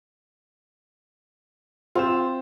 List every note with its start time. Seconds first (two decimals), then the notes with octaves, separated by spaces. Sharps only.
1.95 C4 F4 C5 E7